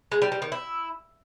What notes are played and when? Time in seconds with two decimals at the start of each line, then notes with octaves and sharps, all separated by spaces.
0.12 G#3
0.22 G3
0.32 G3
0.42 D#3
0.52 E4